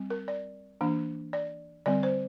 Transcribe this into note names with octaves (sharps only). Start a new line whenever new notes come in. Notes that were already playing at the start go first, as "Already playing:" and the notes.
Already playing: G3 C4
A#4
D5
E3 A#3 D4
D5
D3 G3 C4 D5
C5